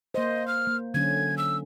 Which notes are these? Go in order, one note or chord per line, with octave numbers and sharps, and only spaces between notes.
A#3 C5 D#5
F6
A#3
D3 F#3 C#4 G#6
E6